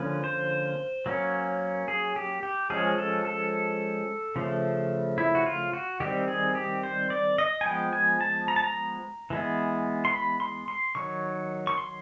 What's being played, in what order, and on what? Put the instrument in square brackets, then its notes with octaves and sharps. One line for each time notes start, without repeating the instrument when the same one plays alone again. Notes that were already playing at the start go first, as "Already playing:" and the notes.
Already playing: [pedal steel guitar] D3 F3 A#3 C#4 B4
C5
F#3 A#3 C#4
G#4
G4
G4
F3 G#3 C#4 G#4
A4
A4
C#3 F3 A3
E4
F#4
F4
F#4
D#3 G3 C4 G4
G#4
G4
C5
D5
D#5
G#5
F3 G#3 B3 G5
G#5
A5
A#5
A5
A#5
E3 G#3 B3
C6
B5
C6
C6
D#3 F#3 C#6
C#6
C6